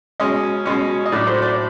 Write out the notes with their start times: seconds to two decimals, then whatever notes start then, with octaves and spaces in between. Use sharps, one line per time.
0.20 B2 G#3 C#4 D#5
0.66 B2 G#3 C#4 C#5
1.06 D#5
1.12 A2 F#3 A3 D4 D5
1.27 C5
1.42 D5